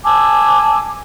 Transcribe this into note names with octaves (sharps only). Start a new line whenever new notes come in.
G#5 A5 D6 E6